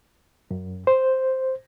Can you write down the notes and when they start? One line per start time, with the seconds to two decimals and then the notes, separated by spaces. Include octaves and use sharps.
0.51 F#2
0.87 C5